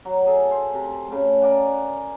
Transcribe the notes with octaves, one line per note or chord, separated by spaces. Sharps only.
F#3
G#4 A4
C5
C3
C#3 A3
A#4 D5 F#5 G#5